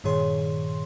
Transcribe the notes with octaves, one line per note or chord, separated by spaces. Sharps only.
G2 A#2 D#3 G#4 C#5 C6